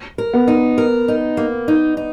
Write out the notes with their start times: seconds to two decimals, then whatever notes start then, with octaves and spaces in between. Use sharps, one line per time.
0.18 A#4
0.34 B3
0.48 D#4
0.78 A#4
1.08 D#4
1.37 A#3
1.68 D#4
1.97 D#4